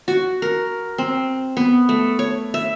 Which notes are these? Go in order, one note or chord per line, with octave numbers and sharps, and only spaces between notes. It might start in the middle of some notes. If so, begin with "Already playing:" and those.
F#4
A#4
C4
B3
A3
C#5
E5